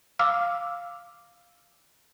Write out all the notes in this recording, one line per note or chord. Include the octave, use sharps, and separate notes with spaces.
F5 D6 E6 F6